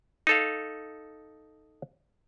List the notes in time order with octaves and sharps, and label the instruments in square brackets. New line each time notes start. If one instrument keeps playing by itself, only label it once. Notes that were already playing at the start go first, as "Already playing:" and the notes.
[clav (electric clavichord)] D#4 A4 F5